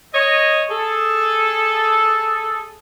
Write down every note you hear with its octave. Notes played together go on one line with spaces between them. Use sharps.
C#5 D#5
G#4 A4